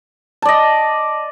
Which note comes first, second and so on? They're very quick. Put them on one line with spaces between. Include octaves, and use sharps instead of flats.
A5 D5 D#5